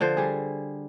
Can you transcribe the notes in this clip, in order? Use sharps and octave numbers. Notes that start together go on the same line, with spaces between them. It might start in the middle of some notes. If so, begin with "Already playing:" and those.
D3 F3 C5
G3 G#4